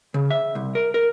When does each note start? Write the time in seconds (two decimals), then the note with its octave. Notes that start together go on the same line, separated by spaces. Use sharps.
0.14 C#3
0.31 E5
0.55 C2
0.75 A#4
0.94 A#4